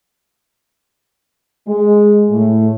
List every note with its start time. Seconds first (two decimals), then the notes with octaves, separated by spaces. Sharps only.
1.68 G#3
2.30 A2